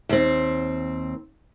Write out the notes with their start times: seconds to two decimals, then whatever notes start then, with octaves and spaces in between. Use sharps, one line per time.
0.09 D#2 C4